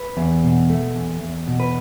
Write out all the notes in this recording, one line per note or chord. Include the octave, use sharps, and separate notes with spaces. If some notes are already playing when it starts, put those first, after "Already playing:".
Already playing: B4
E2
B2
A3
E2
E2
B2
B4